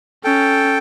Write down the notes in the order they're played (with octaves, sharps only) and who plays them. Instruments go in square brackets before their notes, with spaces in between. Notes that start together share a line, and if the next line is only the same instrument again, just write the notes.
[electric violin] C#4 [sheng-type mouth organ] A4 G5